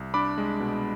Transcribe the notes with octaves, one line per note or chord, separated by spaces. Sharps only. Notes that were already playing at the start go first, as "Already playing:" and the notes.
Already playing: C2
D4 B5 D6
G#3
B2